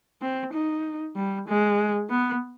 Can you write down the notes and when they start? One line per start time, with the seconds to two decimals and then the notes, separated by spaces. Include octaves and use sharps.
0.22 C4
0.53 D#4
1.16 G3
1.48 G#3
2.10 B3